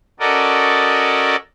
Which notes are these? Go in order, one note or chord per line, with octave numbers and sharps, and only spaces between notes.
C#4 F#4 A4 A#4 D5 D#5